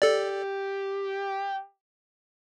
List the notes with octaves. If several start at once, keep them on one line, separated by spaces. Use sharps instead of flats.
G4 A4 D5